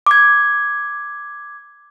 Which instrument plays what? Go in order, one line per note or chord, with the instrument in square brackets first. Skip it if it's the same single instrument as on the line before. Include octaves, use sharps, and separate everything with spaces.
[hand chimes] D6 G#6